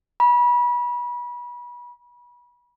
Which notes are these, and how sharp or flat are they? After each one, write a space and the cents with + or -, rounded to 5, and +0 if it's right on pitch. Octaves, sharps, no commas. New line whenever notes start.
B5 -30